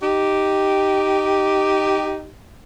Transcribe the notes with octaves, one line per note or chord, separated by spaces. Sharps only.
D#4 G4